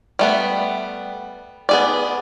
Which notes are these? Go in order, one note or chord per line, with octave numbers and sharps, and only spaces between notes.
G3 A3 B3
B3 G#4 D5